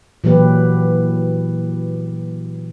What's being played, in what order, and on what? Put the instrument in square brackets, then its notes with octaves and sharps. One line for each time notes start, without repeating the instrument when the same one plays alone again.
[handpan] A#2 E3 F#3 A#3 G4 B4